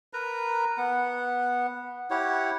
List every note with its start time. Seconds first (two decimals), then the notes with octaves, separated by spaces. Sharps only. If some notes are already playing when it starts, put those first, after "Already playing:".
0.13 A#4 B4 A#5
0.77 B3 F#5
2.10 E4 G4 C#5 F#5